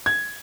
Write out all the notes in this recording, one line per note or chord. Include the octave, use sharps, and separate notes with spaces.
G#6